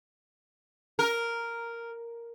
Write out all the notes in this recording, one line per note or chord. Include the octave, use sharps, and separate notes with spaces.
A#4